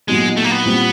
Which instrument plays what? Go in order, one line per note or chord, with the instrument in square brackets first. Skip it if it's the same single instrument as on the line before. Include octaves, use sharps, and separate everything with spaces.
[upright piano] A#2 F#3 B3 D#4 G4 [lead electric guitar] G#3
[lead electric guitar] A3
A#3
B3
[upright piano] A#2 G3 C4